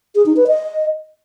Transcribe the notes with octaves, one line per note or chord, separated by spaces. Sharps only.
G#4
D#4
B4
D#5